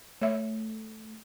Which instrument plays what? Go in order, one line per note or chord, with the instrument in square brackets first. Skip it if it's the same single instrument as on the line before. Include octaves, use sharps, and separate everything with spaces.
[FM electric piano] A3 [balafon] C#5 E5